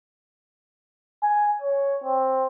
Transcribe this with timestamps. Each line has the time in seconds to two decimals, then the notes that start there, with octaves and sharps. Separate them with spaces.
1.23 G#5
1.62 C#5
2.04 C4